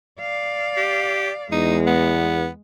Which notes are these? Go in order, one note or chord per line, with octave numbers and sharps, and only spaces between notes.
D5 F5
G4
E2 G#3 D#4
B3